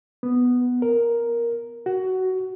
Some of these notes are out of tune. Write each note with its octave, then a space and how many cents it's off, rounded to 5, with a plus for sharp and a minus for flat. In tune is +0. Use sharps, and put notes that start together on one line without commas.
B3 +0
A#4 +5
F#4 +15